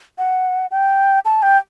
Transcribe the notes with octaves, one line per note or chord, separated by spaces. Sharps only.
F#5
G5
A5
G5